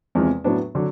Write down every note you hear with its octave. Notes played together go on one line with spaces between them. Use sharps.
E2 C3 F3 G#3
A2 F#3 B3 D4
D3 F#3